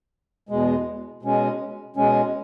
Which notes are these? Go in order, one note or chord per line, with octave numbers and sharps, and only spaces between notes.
E2 B2 G#3
B2 G#3 C#4
B2 G#3 C#4